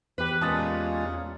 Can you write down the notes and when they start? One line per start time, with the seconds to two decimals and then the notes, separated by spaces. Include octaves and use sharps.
0.18 E2 G4 B4
0.41 A#2 G#3 C#4 F4 A5 D#6 A6